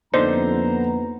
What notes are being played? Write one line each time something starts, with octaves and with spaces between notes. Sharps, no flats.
F2 D3 A#3 B3 D#4 C5 A#5